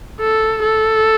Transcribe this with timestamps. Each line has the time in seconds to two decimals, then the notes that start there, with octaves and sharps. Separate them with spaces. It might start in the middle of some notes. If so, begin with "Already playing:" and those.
0.20 A4
0.63 A4